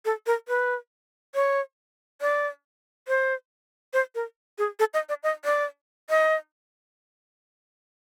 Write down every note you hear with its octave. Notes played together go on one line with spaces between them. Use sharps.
A4
A#4
B4
C#5
D5
C5
C5
A#4
G#4
A4
D#5
D5
D#5
D5
D#5